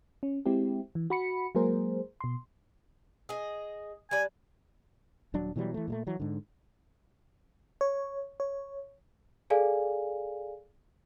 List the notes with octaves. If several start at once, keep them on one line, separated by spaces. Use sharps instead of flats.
C#4
G#3 C4 E4 G4
E3
F#4 B5 C#7
F#3 G#3 A#3 G#4 A#4 C5
B2 C6
G#4 D#5
G3 D4 G#5
D#1 F#3 D4
B2 E3 F#3 G3
E3 A3
A#2 G#3 A3
E3 F#3
G#2 D3
C#5
C#5
G#4 A4 D5 F5 G#5